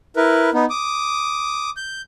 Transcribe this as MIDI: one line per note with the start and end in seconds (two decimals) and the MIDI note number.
0.16 0.50 64
0.16 0.50 70
0.16 0.50 71
0.54 0.65 59
0.54 0.65 63
0.70 1.70 86
0.70 1.70 87
1.77 2.01 91